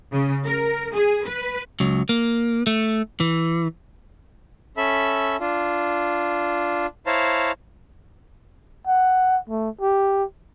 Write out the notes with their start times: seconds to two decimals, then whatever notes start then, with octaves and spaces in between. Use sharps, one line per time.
0.11 C#3
0.45 A#4
0.93 G#4
1.25 B4
1.80 C#2 F#3
2.09 A#3
2.67 A3
3.20 E3
4.77 C#4 A4 E5 B5
5.40 D4 F4
7.07 E4 C5 C#5 F5 A5 A#5
8.87 F#5
9.49 A3
9.81 G4